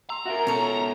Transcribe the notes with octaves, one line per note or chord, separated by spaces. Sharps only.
A#5 C6 E6
F#4 A#4 E5 F5
G#2 B2 C#4 A4 C#5